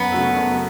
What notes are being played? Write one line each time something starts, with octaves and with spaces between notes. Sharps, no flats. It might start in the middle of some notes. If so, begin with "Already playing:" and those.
Already playing: F#2 B3
C#3 A3 F#4 A4
F#2